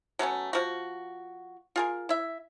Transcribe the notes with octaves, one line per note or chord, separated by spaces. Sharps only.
F#3 A3 B3 C#4
F3 F#4
F4 G#4 A#4
E4 E5